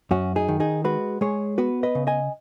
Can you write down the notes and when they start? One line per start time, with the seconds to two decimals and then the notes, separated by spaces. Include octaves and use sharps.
0.11 F#2 C#4 F#4
0.36 D#4 G#4
0.48 D#3
0.60 D#4 G#4
0.84 G#3 F#4 B4
1.21 G#3 G#4 C#5
1.58 B3 F#4 B4
1.83 B4 D#5
1.95 C#3
2.07 D#5 G#5